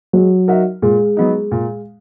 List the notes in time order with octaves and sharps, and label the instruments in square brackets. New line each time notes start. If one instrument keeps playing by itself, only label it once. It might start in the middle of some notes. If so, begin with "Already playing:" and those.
[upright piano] F#3 [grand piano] G#3
[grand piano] D#4 F#4 A#4 E5
[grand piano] A#2 [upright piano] G#3
[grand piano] F#3 B3 D#4
A#2